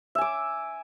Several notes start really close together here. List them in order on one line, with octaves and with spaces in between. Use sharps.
E5 G#5 D6